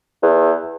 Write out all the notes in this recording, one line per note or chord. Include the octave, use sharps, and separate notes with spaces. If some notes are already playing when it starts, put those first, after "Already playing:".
E2